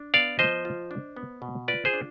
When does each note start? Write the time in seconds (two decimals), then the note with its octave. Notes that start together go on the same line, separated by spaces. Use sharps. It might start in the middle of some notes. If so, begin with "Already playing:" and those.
Already playing: D4
0.14 B3 D5 F5
0.39 F3 C5 D#5
0.65 F4
0.91 D4
1.17 B3
1.42 B2
1.68 F4 B4 D5
1.85 G#4 C5
1.94 D4